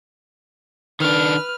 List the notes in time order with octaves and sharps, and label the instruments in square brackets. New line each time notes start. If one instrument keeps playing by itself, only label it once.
[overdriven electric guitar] D#3 D4 [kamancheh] B4 F6